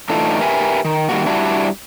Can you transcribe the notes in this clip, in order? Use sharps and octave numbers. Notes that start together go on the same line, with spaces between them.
A2 E3 D4 D#4 F4 A4
G4 A#4 B4 E5 G#5
D#3
D#3 G3 A#3 F#4
G3 D4 E4 F#4